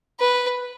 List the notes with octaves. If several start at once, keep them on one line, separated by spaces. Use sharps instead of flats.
B4